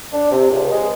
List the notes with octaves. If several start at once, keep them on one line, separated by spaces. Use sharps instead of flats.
D4
C3
C#2
G#3